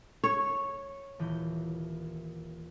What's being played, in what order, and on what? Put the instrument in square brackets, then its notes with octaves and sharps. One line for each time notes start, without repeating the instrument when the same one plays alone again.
[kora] C#5
[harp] D#1 E3 G6